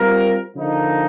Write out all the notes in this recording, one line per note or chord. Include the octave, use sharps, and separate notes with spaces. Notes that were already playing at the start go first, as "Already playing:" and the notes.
Already playing: G3 C4 F4 A#4
D3 F3 A#3 D#4